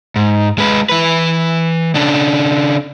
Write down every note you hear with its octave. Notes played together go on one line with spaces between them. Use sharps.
G#2
G#3 B4
E3 B4
C#3 D4